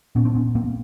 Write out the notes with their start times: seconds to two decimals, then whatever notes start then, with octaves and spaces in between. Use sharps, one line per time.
0.15 A#2 B3 C#4
0.25 C4 D4
0.35 B3 C#4
0.55 A#3 C4